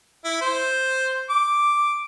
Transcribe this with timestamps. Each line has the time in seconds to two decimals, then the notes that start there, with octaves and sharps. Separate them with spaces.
0.25 E4
0.41 C5
1.29 D6